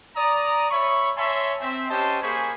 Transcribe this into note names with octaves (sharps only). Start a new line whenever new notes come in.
D5 A#5 D#6
C#5 E5 B5 C#6
C#5 E5 G#5 A5 B5 C6
C4 E5
C#4 G4 C5 D#5 G#5 A5
A#3 G#4 C5 G#5 B5 C#6